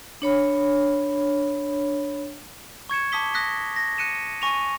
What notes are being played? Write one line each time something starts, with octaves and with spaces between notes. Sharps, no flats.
D4 C#5 B5
C#6 G#6 C#7 E7
A5 D6 D#6 B6 G7
D#6 F#6 A#6 B6
A#6
F#6 C#7 D#7 E7
G#5 C#6 A#6 D#7 F7